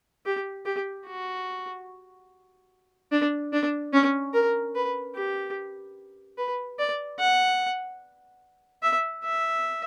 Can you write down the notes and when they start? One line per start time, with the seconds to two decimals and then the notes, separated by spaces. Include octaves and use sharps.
0.26 G4
0.66 G4
1.07 F#4
3.11 D4
3.52 D4
3.93 C#4
4.33 A#4
4.75 B4
5.15 G4
6.38 B4
6.79 D5
7.19 F#5
8.82 E5
9.24 E5